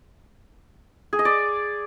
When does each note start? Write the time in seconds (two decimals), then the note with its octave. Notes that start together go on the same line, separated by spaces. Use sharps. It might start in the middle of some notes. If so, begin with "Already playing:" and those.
1.13 G#4
1.19 D#5
1.25 D5